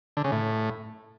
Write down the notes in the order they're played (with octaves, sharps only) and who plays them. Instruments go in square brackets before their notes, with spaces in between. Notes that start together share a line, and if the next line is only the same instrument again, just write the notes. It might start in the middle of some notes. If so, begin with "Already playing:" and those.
[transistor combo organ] D3
C#3
A2